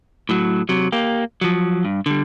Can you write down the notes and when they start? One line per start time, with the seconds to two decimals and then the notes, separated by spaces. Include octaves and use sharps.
0.29 A2 F#3
0.69 C3 F#3
0.92 A#3 G4
1.41 F3 F#3
1.85 G2
2.06 D3 G3